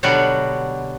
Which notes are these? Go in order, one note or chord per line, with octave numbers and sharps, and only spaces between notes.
B2 D3 F#3 G3 F#4